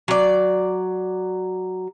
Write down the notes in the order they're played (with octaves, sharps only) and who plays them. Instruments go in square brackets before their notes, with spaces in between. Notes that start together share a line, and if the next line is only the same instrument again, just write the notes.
[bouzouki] F#3 D5